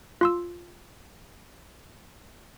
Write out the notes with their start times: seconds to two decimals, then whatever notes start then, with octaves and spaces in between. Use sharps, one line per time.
0.21 F4 C6 E6